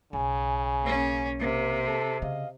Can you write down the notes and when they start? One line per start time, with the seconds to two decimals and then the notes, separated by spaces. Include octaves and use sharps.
0.13 B1 C#3 G#5
0.82 A#3 C#4
1.39 C3 A#3
1.86 A4
2.22 C#3 D#5 F5